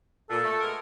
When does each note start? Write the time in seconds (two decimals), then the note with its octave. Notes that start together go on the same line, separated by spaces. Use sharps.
0.30 A#2 A4
0.43 A3
0.61 G#3 B3 A#4